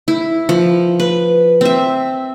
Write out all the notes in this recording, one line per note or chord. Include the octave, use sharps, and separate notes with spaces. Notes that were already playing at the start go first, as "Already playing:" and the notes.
E4
F3
B4
C4 E5